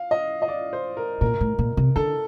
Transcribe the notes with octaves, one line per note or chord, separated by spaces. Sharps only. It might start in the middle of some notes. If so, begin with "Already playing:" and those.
Already playing: F5
D#5
D#5
D5
C5
A#4
A#2 A#4
A2
A#2
C3
D3 A4